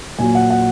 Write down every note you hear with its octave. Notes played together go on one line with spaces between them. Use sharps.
A#2 F#3 G#5
F#5
F#5